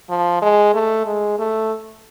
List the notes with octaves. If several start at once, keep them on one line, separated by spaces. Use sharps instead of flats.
F3
G#3
A3
G#3
A3